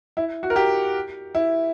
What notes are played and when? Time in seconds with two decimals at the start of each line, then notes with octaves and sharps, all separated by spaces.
0.17 E4
0.43 F#4
0.50 A#4
0.56 G4
1.35 E4